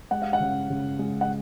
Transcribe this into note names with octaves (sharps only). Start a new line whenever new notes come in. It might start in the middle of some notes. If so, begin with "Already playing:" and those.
G#3 F#5
F5
F#5
C#3
C#3
G#3
F#5